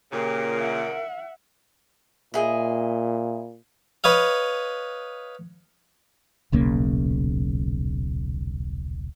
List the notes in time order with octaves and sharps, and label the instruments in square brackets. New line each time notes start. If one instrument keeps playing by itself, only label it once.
[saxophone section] A#2 C#3 [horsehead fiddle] G4 [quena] A#4
[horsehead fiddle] E5 F#5
[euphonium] A#2 [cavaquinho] E4 G#4 D#5
[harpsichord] B4 C#5 D#5 F5
[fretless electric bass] D#1 B1 C#3 A#3